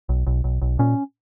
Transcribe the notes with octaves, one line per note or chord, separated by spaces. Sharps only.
B1
B1
B1
B1
A#2 C#4